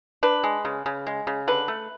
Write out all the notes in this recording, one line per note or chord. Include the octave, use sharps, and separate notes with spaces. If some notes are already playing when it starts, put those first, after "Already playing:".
D4 B4
G#3
C#3
C#3
G#3
C#3
D3 B4
A3